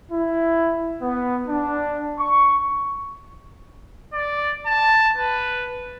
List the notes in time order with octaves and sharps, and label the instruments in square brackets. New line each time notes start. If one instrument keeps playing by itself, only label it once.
[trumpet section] E4
B3
D4
C#6
[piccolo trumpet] D5
A5
B4